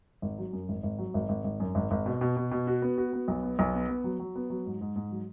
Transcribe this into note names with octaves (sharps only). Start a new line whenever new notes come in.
G#1
F#3
F#2
G#1
G#1
F#3
G#1
G#1
G#1
F#2
G#1
G#1
B2
B2
B2
B2
F#4
B3
F#4
B3
B1
B3
B1
B3
B3
F#3
F#3
B3
F#3
G#2
G#2
G#2
F#3